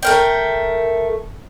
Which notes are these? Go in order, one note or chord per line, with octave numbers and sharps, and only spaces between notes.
A3 A#4 G5